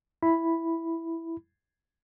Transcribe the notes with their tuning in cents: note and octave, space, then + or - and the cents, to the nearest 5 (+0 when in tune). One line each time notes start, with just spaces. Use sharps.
E4 +0 B5 +0